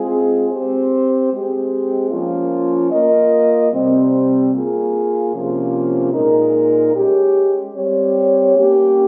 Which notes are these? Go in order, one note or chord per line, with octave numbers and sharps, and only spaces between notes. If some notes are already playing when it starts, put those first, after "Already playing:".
Already playing: G#3 C4 F4 G#4
C4 G4 C5
G#3 C4 G4
F3 A#3 C#4 F4
A#3 F4 A#4 D#5
C3 G3 C4
A#3 F4 G#4
C3 F3 A#3 C#4 F4
A#2 G#3 D#4 A#4
G#3 C#4 G4
G3 C4 G4 C#5
A#3 C#4 G4